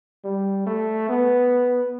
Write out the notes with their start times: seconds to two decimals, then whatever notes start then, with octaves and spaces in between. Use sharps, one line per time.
0.24 G3
0.67 A3
1.09 B3